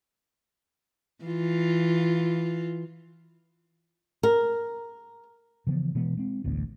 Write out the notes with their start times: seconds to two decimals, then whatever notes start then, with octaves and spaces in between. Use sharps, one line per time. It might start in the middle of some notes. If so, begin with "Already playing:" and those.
1.24 E3 F4
4.23 A#4
5.67 C#3 E3 F3 B3
5.95 B2 E3 G#3 B3
6.17 G#3 C4
6.44 A1 D2 B3